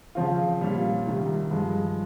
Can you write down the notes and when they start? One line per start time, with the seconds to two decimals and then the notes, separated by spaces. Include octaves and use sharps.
0.15 C#3 F3 C4 F4
0.61 A#2 G3 C#4 F4
1.06 C2 C3 D#3
1.51 G2 F3 G#3